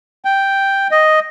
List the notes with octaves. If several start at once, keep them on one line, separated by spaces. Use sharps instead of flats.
G5
D#5